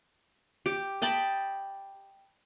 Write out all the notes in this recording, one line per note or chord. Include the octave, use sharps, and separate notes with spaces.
G4
D#5 G5 A5 B5